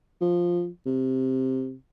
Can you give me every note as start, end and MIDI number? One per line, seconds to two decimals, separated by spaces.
0.21 0.68 53
0.86 1.74 48